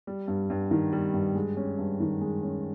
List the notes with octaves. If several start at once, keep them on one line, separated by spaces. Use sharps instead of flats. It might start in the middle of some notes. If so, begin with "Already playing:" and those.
G3
G2
G2
D#3
G3
G2
G#3
C#4
G2
D#3
G#3
C#4